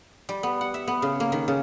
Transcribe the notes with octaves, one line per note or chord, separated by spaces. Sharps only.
G3
B3
F#5
E5
B3
C#3
A#3
D#3
C#3